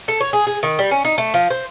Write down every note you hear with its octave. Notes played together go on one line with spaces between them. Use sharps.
A4
C#5
G#4
G#4
D#3
G3
C#4
D#4
A3
F3
C5